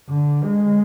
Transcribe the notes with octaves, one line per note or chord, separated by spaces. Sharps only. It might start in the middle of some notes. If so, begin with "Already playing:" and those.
D3
G#3